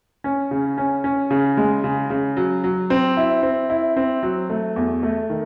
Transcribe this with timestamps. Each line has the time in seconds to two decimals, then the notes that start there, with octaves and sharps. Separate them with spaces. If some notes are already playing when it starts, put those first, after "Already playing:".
0.24 C#4
0.51 C#3
0.78 C#4
1.04 C#4
1.31 C#3
1.57 G#3
1.84 C#3
2.10 C#3
2.37 F#3
2.64 F#3
2.90 C4
3.17 E4
3.43 C4
3.70 E4
3.97 C4
4.23 F#3
4.50 A3
4.76 E2
5.03 A3
5.30 D#3